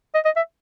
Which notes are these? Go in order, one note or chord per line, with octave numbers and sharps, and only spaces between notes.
D#5
D#5
E5